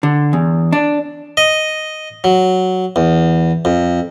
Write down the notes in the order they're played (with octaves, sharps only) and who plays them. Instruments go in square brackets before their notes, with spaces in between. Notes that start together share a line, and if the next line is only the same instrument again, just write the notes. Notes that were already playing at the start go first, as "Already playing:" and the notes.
[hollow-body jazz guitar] D3
E2
D4
[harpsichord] D#5
F#3
E2
F2